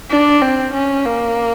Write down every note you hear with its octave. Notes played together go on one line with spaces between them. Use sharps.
D4
C4
C#4
A#3